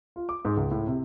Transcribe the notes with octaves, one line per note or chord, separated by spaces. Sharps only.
F4
D6
G#2
C#2
A2
C3